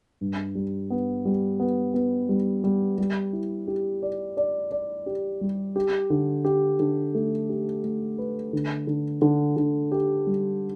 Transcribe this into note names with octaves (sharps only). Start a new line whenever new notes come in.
G2
G3
B3
G3
B3
B3
G3
G3
G3
E4
G4
D5
D5
D5
G4
G3
G4
D3
G4
D3
A3
G4
A3
B4
D3
D3
D3
D3
G4
G3